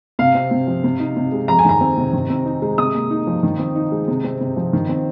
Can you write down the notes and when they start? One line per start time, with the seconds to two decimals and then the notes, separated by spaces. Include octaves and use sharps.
0.19 C3 F5
0.35 C4
0.51 C3
0.67 F3
0.84 C3
1.00 D#4
1.17 C3
1.32 G#3
1.48 F2 A#5
1.59 G#5
1.65 D#3 A#5
1.81 C4
1.97 C3
2.13 D#3
2.30 C4
2.46 D#4
2.62 G#3
2.78 C3 D#6
2.95 A#3
3.11 D#4
3.27 F3
3.43 D#3
3.59 C4
3.76 D#4
3.92 G#3
4.08 C3
4.24 C4
4.41 C3
4.57 F3
4.73 D#3
4.89 C4